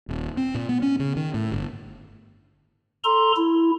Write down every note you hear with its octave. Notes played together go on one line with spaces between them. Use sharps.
D#1
C4
A#2
B3
C#4
C#3
D#3
A2
G1
A4 A#5 C6
E4